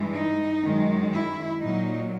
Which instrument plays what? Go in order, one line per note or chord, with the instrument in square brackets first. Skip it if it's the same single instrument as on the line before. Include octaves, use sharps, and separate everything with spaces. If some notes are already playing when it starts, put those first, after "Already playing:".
Already playing: [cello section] G2 E3 G#3
D#4
F#2 D#3 G#3
E4
A#2 F#3 D#4